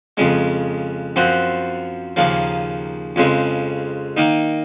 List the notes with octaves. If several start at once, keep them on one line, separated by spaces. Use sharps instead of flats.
F2 C#3 G#3
F#2 F3 C4 F#4 C5
D#2 C#3 F3 A#3
F2 C#3 G#3 C4
D#3 A#3 D#4